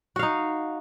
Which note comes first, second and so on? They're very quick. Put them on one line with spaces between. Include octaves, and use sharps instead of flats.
F#4 F5 D#4